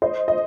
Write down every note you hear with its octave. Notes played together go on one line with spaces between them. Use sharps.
C5 D#5
D#5